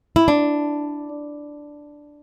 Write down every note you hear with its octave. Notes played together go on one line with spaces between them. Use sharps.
E4
D4